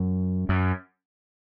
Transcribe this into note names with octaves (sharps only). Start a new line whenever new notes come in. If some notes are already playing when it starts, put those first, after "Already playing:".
Already playing: F#2
F#2